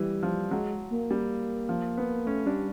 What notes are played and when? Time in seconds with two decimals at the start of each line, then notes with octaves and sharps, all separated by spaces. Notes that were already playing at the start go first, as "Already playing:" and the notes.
Already playing: E3 G3
0.23 F3
0.51 F#3 G#3
0.91 A#3
1.11 G3
1.69 F3
1.98 B3
2.26 A3 C#4
2.46 G3 D4